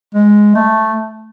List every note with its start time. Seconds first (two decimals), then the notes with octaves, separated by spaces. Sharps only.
0.14 G#3
0.55 A3